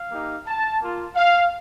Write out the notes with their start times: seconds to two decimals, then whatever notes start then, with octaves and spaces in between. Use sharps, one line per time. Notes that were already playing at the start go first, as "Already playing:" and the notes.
Already playing: F5
0.10 A#3 D#4 G4
0.46 A5
0.80 A#3 F4
1.15 F5